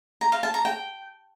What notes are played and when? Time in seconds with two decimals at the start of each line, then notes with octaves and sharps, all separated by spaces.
0.21 A#5
0.32 F5
0.43 A5
0.54 A#5
0.65 G5